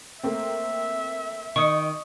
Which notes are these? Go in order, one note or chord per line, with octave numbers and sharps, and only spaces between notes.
A3 A#3 C4 E5
D#3 C#6 D#6 C#7